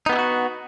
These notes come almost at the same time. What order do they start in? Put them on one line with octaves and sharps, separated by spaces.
D#4 B3 G4 E4 F#4